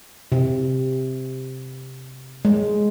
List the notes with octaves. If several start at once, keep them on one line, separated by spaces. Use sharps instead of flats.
C3
G#3